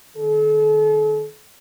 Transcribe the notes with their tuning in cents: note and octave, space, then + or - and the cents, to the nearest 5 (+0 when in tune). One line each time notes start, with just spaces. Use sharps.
D#3 -45 A4 -40